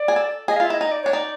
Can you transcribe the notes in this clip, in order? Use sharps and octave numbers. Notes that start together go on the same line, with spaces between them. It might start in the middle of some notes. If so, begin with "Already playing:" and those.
Already playing: D5
G#4
A4
G#4 D#5
F5
F4 E5
E4 D#5
D#4 D#5
D5
C#5
D4
D#4 D5